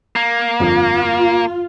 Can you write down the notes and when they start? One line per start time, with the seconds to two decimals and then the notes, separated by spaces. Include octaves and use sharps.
0.16 A#3
0.60 G1 F2 F3 F4